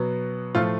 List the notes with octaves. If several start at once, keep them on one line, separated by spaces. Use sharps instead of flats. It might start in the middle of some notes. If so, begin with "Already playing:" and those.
Already playing: B2 F#3 B3
A2 F3 A3 F4